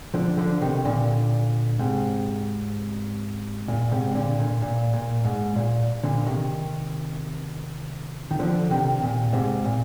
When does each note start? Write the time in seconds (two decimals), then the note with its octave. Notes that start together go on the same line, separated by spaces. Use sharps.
0.14 D3 F3
0.37 D3 F3
0.62 C3 D#3
0.85 A#2 D3
1.79 G#2 C3
3.68 A#2
3.91 G#2 C3
4.15 A#2 D3
4.39 A#2
4.62 A#2
4.93 A#2
5.25 G#2
5.56 A#2
6.04 A#2 D3
6.27 C3 D#3
8.31 D#3
8.39 D3 F3
8.71 C3 D#3
9.02 A#2
9.33 G#2 C3
9.64 A#2